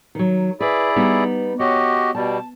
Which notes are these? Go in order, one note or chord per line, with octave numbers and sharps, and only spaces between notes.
D#3 F#3
E4 G#4 B4 D5
G3 B3 D#4
F#4 G4 C#5 D#5
B2 G3 A5